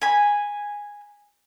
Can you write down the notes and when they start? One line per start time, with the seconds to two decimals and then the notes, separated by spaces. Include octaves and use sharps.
0.02 G#5 B5